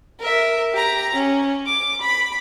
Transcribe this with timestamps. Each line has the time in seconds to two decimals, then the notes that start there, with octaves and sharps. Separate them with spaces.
0.19 A#4 E5
0.73 G4 A#5
1.15 C#4
1.66 D6
2.01 B5